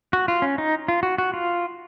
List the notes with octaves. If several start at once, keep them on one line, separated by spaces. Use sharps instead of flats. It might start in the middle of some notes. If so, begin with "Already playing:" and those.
F#4
F4
C#4
D#4
F4
F#4
F#4
F4